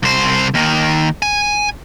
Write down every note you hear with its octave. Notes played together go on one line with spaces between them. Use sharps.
C2 C5
D#2 D#3
G#5